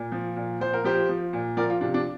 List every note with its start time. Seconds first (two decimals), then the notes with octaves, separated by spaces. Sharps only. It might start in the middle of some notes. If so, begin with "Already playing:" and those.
Already playing: A#2
0.12 F3
0.36 A#2
0.60 F3 C5
0.73 A#4
0.84 F3 G4 C5
1.09 F3
1.33 A#2
1.57 F3 A#4 D5
1.70 F4
1.81 C3 D4
1.94 D4